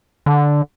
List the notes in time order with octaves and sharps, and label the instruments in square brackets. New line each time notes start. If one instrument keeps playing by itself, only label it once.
[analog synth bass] D3